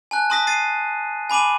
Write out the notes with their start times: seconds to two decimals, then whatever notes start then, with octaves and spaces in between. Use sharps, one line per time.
0.11 G#5 A5 F#6
0.30 A5 C6 D#6 A#6 B6
0.47 A6 C7 D#7
1.30 G#5 B5 D6 D#7 F#7